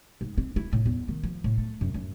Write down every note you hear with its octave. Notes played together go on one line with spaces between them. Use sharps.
G#2
C4
E4
A2
E2
D#3
F3
A2
A3
F#2
F#2